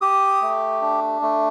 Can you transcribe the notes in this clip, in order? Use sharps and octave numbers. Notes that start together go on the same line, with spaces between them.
G4 D#6
A3
D4
A3